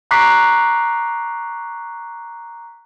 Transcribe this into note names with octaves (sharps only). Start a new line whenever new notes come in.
A#5 C#6 D6 F#6 B6 C7